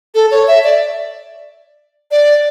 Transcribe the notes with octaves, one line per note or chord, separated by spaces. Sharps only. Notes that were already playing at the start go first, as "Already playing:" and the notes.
A4
C#5
E5
D5
D5